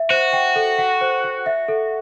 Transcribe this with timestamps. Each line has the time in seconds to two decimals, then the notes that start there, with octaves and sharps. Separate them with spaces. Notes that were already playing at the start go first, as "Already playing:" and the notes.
Already playing: E5
0.10 F#4 C5
0.33 G5
0.56 A4
0.78 F#5
1.01 C5
1.24 F#5
1.46 E5
1.68 A4